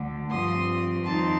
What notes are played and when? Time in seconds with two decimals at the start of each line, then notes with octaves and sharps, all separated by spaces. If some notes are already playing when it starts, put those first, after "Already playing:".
Already playing: D2 D3 A3
0.30 G2 F3 C4 C6 D#6
1.05 F2 D#3 G3 C4 D#4 A5 C6